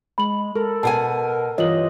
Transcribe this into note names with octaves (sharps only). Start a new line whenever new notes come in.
G#3 B5 F#7
A4 A#4
B2 F#5 G#5 A5
G2 E3 F4 C#5 D#5 F#7